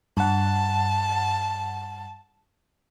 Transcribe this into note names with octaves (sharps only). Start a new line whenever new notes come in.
G2 F#5 A5